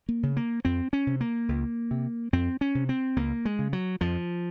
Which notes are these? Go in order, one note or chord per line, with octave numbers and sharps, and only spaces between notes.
A#3
C#3
A#3
F2 C4
C#4
C3
A#3
C#2
C3
F2 C4
C#4
C3
C4
C#2 A#3
G#3
C#3
F#3
F2 F3